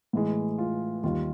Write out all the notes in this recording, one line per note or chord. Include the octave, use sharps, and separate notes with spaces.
A2 E3 G#3
F4
D#2 D#3 G3 F4